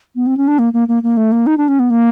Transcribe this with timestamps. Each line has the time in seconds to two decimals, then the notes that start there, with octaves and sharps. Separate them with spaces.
0.16 B3
0.27 C4
0.37 C#4
0.48 D4
0.59 A#3
0.73 A#3
0.88 A#3
1.03 A#3
1.17 A3
1.32 A#3
1.47 D#4
1.58 D4
1.68 C#4
1.79 B3
1.90 A#3